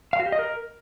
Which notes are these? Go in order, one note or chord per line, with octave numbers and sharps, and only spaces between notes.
F5
F#4
G4
D#5
A#4